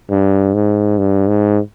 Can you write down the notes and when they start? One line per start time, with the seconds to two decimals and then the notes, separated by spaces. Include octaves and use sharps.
0.10 G2
0.54 G#2
0.98 G2
1.28 G#2